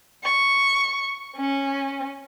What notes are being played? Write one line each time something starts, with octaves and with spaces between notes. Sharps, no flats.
C#6
C#4